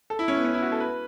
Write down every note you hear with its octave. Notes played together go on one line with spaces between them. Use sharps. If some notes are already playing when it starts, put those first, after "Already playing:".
A4
E4
C#4
B3
C#4
E4
F#4
A4
B4